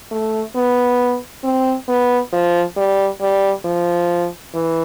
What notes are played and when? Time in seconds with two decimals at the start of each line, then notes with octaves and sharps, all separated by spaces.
0.11 A3
0.55 B3
1.44 C4
1.88 B3
2.33 F3
2.77 G3
3.21 G3
3.65 F3
4.54 E3